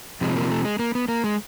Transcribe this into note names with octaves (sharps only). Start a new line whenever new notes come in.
F2 C3 F3 G#3
A#3
A3
G#3
A#3
B3
A#3
G#3